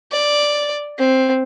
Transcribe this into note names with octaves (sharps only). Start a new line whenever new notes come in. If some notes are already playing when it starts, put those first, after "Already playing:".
D5
C4